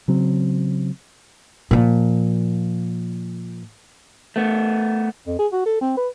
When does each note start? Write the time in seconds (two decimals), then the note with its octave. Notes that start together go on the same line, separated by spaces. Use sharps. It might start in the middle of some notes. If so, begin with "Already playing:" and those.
0.08 C#3 F#3 C4
1.71 A#2 F3
4.36 A3 B3
5.27 F2
5.39 G#4
5.53 F#4
5.66 A4
5.81 C4
5.97 B4